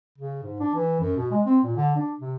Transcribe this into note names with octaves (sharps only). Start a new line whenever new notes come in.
C#3
G#2
D4
E3
F#2
B2
G#3
C4
A#2
D3
D4
C3